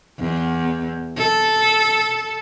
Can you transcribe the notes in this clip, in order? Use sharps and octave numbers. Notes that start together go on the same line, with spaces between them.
E2
A4